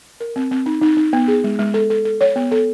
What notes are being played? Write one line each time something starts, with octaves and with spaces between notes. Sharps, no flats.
A#4
C4
C4
D#4
D#4
D#4
B3
G#4
G#3
G#3
A4
A4
A4
C#5
B3
A4